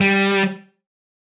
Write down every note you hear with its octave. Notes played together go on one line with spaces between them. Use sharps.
G3